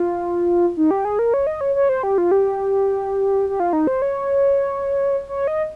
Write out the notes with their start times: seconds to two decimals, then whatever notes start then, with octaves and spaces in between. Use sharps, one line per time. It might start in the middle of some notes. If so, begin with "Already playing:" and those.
Already playing: F4
0.77 D#4
0.91 G4
1.05 G#4
1.19 A#4
1.34 C#5
1.47 D#5
1.61 C#5
1.75 C#5
1.89 C5
2.03 G4
2.18 F4
2.31 G4
3.49 G4
3.60 F4
3.73 D#4
3.87 C5
4.02 C#5
5.29 C#5
5.47 D#5